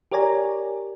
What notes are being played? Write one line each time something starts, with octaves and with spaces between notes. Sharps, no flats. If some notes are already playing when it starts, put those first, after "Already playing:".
G4 A#4 C#5 D5 G#5 A#5